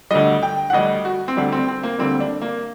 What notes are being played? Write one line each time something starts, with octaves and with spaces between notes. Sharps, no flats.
D2 D3 G3 D#5
G5
F#5
D2 D3 G3 D#5
F#4
C4
D2 D3 G3 D4
C4
C4
A#3
D2 D3 G3 C4
D4
A#3